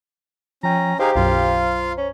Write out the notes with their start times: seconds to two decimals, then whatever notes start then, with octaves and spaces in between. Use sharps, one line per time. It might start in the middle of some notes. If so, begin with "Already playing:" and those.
0.63 F3 C#4 G5 A#5
0.99 D#4 G4 G#4 C5 F5 A#5
1.15 B1 F#2 F4 F5
1.98 C#4